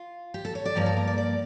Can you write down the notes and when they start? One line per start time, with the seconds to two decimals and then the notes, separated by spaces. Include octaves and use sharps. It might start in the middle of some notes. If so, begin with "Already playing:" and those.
Already playing: F4
0.34 G4
0.45 A4
0.55 C#5
0.65 D5
0.76 G2 F3 A#3 C#5
0.86 A4
0.97 A#4
1.07 D5
1.18 D5